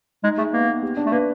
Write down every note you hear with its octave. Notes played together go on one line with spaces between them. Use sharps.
G#3 D#4
A3 G#4
A#3 B3
B3
G4
D4
A3
A#3 B4